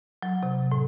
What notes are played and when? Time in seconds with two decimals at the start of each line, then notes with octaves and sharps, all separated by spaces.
0.23 F#3
0.43 C3
0.72 A2